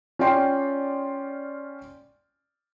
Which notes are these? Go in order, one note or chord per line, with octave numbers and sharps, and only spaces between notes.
C#4 F4 D5 G5 C6 C7